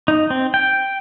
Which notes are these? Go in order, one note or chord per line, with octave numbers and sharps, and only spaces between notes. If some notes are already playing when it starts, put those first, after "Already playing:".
D#4
C4
G5